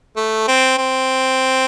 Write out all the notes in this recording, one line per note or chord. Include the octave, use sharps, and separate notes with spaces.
A3
C4
C4